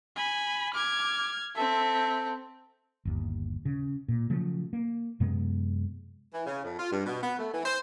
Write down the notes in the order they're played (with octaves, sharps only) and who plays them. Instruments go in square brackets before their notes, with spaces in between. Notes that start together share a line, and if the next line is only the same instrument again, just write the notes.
[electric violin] G#5 B5
[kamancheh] D6 [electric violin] F6 G#6
[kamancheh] C4 A4 [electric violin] E5
[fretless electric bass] G1 D#2
C#3
A#2
C#3 F3 F#3 A3
A#3
F#2 C3 G#3 B3
[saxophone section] E3
C#3
F2
F4
G2
B2
B3
A3
E3
C5